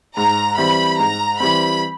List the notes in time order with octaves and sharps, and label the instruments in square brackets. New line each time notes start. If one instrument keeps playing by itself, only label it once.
[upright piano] G#2 [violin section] A#5
[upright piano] E3 G3 C4 [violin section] B5
[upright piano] G#2 [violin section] A#5
[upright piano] E3 G3 C4 [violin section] B5